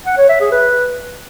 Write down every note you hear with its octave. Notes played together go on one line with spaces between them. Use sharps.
F#5
C#5
E5
G#4
B4